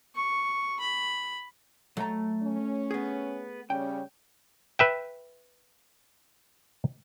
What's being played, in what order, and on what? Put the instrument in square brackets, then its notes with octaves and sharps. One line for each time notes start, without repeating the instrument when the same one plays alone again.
[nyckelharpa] C#6
B5
[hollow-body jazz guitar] F#3 A#5 [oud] A3
[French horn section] C#4
[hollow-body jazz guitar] B3 G#4
[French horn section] C#3 G3 C#4 [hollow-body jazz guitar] G5
[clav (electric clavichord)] B4 E5 G5